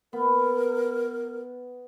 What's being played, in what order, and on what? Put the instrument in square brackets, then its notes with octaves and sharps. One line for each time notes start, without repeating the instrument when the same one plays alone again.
[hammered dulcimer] B3 [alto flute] A#4